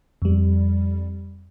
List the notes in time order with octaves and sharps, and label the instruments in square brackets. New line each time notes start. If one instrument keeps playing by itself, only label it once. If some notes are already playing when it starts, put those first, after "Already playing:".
[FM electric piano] F2 G3